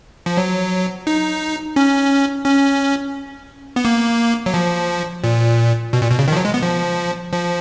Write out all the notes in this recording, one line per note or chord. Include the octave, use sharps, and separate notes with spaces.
F3
F#3
D#4
C#4
C#4
B3
A#3
F#3
F3
A#2
B2
A#2
B2
C#3
D#3
F3
F#3
G#3
B3
F3
F3